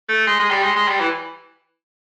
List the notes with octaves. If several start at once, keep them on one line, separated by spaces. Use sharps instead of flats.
A3
G#3
G#3
G3
G#3
G#3
G3
E3